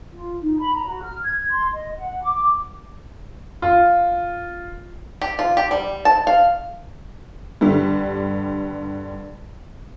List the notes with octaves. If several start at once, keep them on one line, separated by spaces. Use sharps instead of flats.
F4
D#4
B5
A#5
F#4
F6
G#6
C6
D#5
F#5
D6
F4
G4
F4
G4
G3
A5
F5
G2 D3 G3